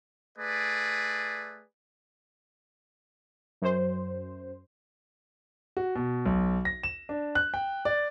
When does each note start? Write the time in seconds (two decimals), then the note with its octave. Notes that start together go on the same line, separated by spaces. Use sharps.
0.37 A3 G#4 B4 D5
3.62 F#2 C5
5.77 F#4
5.96 B2
6.25 B1
6.65 A#6
6.83 E7
7.09 D4
7.35 F#6
7.54 G5
7.85 D5